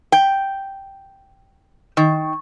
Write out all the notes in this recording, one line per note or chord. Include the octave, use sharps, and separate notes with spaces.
G5
D#3